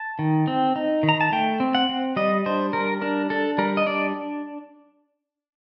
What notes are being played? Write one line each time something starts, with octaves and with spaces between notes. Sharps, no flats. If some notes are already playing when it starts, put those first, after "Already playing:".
Already playing: A5
D#3
C4
D#4
D#3
A#5
A5
A3 G5
C4
F#5
C4
G3 D#5
D4 C5
G3 A#4
D4 A#4
D4 A4
G3 A#4
D#5
D4 D5